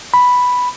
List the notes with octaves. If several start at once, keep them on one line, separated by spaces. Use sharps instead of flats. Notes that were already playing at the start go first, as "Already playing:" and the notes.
B5